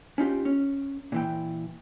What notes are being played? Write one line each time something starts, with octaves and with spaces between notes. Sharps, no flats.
C#4 D#4 F4 G4
C#4
A#2 E3 G5